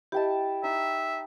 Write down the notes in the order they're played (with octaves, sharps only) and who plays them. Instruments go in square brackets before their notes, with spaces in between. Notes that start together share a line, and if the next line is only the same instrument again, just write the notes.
[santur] E4 G5 A5 [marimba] G4 D#5
[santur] D#4 D#6 [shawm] E5